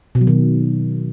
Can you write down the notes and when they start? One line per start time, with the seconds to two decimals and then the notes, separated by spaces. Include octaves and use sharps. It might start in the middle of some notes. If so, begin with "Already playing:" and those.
0.15 B2
0.21 F#3
0.27 D#3